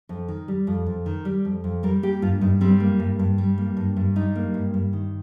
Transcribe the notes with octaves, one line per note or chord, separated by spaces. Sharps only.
F2
D#3
G3
F2
F2
D#3
G3
F2
F2
G3 A#4
A#3 G4
G2 F4
G2 D#4
G3 C4
A#3
G2
G2
G3
A#3
G2
G2
G3 D#4
A#3
G2
G2
D#3